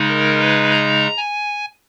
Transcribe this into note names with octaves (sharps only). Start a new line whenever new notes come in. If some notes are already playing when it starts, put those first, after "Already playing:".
Already playing: C#3 G#3 D#4
A#4
B4
A#5
G#5